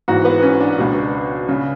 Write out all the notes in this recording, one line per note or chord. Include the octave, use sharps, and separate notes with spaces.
G#1 G#2 E3 F#4
B3
C#4
D4
C#2 B2
C#3